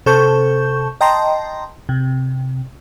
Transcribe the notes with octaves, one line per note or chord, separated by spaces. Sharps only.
C3 A4 C5 A5 C#6 G6
D#5 G5 A5 A#5 C6
C3